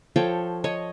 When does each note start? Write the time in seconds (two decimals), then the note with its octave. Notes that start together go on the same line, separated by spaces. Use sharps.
0.16 F3 A4 C#5 G5
0.64 C#5 D#5